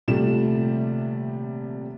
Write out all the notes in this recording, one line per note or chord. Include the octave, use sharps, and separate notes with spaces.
D#1 C3 F3 G3 A3 E7